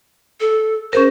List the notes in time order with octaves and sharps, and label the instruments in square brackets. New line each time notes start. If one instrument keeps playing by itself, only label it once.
[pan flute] A4
[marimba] C#4 G#4 A#4 [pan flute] C5